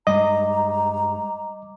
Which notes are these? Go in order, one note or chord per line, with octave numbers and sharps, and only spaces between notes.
G2 G3 G#3 D#5 A#5 D6